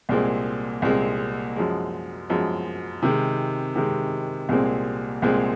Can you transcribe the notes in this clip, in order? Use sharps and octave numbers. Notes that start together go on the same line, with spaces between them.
C2 A#2 G#3 C4
C2 A#2 G#3 C4
F#2 F3 G#3
F#2 F3 G#3
C3 D#3 G#3
C3 D#3 G#3
C2 A#2 G#3 C4
C2 A#2 G#3 C4